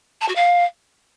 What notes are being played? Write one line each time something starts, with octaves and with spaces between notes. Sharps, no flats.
A5
F#4
F5